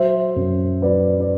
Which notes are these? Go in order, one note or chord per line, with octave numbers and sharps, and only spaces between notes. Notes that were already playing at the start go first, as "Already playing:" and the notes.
Already playing: F#3 C5 E5
F#2
F#3 B4 D5
D5